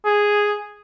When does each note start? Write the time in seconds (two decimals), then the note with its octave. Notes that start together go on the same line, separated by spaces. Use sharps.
0.06 G#4